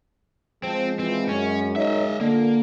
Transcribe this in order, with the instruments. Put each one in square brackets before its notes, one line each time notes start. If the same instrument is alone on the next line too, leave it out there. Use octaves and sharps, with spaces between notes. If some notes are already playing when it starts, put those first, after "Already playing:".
[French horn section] F3 [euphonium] G#3 [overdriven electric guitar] C4
[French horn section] E3 F3 F4 [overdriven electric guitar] C4
[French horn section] F#2 [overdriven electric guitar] C#4
[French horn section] F#2 D#4 C#5 [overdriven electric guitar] D#5 E5
[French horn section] A#2 [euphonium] D3 [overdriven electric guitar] A#3